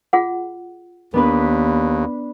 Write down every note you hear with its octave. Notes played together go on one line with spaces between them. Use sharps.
F4 G#4 F#5
D#2 B3 D4 B4